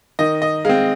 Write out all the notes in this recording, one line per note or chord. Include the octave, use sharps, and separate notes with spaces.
D#3 D#5
D#5
G#3 C4 F5